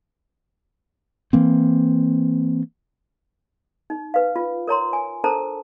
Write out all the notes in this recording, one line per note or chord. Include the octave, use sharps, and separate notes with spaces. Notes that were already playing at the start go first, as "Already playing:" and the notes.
E3 A#3 C4
D#4
B4 F5
F4
A#4 C#5 A#5 C6
G#5
D4 A4 A#4 C5 A5 A#5